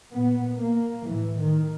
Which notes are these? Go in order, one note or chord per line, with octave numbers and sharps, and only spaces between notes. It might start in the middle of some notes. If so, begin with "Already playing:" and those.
A#2 B3
A#3
A2 E3
D#3